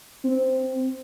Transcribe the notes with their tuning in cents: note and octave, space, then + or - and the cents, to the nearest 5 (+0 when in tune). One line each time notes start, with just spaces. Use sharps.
C4 -5